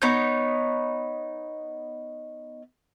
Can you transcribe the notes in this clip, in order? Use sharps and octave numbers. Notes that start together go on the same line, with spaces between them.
B3 D#4 C#5 G6